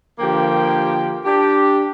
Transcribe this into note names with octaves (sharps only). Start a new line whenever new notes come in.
D3 F3 A#3 G4 G5
D4 G4